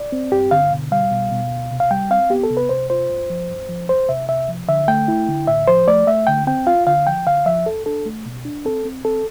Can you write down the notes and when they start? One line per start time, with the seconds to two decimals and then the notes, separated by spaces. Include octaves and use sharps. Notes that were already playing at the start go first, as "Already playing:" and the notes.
Already playing: D5
0.12 C4
0.32 G2 G4
0.51 D3 F5
0.71 B2
0.91 G3 F5
1.11 B2
1.31 B2
1.51 D2
1.71 C3
1.80 F5
1.90 G3 G5
2.10 C4 F5
2.30 B3 G4
2.44 A4
2.50 C3
2.57 B4
2.69 C3 C5
2.90 F4 C5
3.10 G2
3.30 F3
3.49 G2
3.69 F3
3.89 E2 C5
4.09 C3 E5
4.29 C3 E5
4.49 F3
4.68 D3 E5
4.88 A3 G5
5.08 E4
5.28 D3
5.48 A2 E5
5.68 F3 C5
5.87 A3 D5
6.07 A3 E5
6.27 D3 G5
6.47 C4 G5
6.67 F4 F5
6.87 D3 F5
7.07 F3 G5
7.27 D3 F5
7.46 F3 E5
7.66 E2 A4
7.86 D4 A4
8.05 A3
8.26 B2
8.45 D4
8.65 C4 A4
8.85 C4
9.05 C4 A4